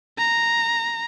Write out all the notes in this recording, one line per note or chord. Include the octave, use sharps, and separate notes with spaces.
A#5